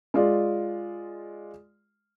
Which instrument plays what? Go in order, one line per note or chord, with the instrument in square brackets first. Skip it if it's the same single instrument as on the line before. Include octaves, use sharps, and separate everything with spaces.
[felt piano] G#3 F4 D5